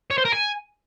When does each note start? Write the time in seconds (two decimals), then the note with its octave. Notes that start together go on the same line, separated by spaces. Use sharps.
0.11 C#5
0.18 C5
0.25 A#4
0.32 G#5